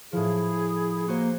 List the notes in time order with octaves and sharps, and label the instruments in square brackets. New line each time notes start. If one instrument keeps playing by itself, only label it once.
[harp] A2 F3 [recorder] E4 [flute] G#4
[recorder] A#3 [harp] F#4 G#4 C5